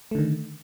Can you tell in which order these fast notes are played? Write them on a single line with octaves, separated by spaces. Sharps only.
A3 D3 D#3